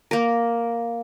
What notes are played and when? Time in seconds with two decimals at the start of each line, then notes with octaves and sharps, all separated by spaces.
0.11 A#3 A#4